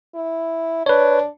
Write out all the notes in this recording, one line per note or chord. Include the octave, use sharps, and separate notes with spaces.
E4
D4 B4 C#5